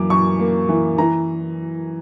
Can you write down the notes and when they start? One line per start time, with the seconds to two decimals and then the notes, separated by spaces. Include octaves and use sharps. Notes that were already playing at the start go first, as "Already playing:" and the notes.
Already playing: F#2 E3 A#3 D6
0.10 F#2 C#6
0.39 A#3
0.69 E3
0.98 E3 A#5